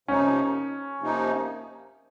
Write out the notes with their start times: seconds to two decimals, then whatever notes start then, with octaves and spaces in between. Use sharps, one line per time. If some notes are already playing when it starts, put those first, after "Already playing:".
0.08 C3 F3 A#3 C#4 D#4
1.00 C3 F3 A#3 D#4